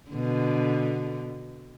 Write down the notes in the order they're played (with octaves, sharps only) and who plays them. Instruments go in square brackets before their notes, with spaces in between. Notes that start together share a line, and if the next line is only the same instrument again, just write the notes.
[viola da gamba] B2 D3